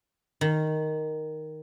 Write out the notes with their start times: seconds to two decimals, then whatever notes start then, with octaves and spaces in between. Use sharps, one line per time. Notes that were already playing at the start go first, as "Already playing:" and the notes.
0.41 D#3